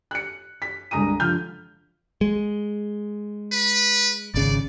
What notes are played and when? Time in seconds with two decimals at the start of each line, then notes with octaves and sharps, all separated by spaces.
0.11 F#6 C#7
0.62 B6
0.91 C2 D3 G#3 A#5 D#6 D#7
1.20 D3 F3 F6 G6
2.21 G#3
3.52 B4
4.34 G#1 C#3 D5